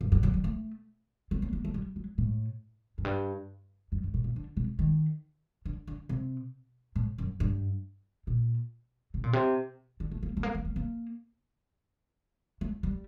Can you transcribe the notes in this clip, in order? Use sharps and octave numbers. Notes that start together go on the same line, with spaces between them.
G2
G2
F#3
G3
A3
C4
A#3
A#3
A3
G3
F#3
A2
F#2
G2
F#2
G2
A2
A#2
D3
C3
D#3
D3
D3
C3
A2
F#2
G2
A#2
C3
A#2
C3
D3
A3
A#3
A3
A#3
A3
A#3
A#3
A3
G3